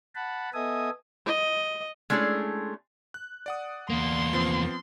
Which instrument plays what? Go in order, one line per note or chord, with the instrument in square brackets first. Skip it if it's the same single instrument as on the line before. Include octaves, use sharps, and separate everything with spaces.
[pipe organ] F#5 A5 B5
B3 A4 D#5 E5 G#5 D#6
[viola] D#5
[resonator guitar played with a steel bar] G#3 A3 C#4 D4 E4 G#4
[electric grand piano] F#6
D5 F#5 D#6
[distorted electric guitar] E2 A#3 [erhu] C6
[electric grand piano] F3 B3 C4